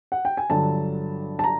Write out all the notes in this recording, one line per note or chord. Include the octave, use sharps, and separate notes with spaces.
F#5
G5
G#5
G1 G2 D3 F#3 A5
A5
A#5